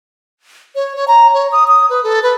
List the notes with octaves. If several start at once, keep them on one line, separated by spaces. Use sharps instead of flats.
C#5
C#5
A#5
C#5
D#6
D#6
B4
A4
B4